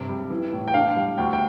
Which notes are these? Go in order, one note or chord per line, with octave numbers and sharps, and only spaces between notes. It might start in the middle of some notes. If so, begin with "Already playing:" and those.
Already playing: G2 C3
G3
E3
A2
G5
D4 F5
G3
D2 G5
G5